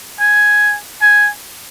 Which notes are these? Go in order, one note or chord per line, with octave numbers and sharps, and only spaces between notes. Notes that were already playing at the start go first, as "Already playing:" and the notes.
G#5
G#5